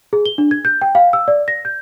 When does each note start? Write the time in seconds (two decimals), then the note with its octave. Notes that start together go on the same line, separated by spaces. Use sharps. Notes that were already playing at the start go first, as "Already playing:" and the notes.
0.13 G#4
0.26 G7
0.38 D4
0.51 G#6
0.65 G6
0.82 G5
0.95 F5
1.13 E6
1.28 D5
1.48 A#6
1.65 G6